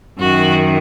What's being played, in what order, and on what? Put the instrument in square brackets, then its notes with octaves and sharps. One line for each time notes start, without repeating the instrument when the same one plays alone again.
[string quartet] F#2 D#3 F#4